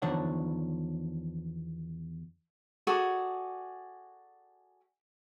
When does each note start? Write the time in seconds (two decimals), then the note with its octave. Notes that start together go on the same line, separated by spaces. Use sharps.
0.02 E2 D#3 F3 D4 C#5 F#5
2.87 F#4 G#4 A4 D5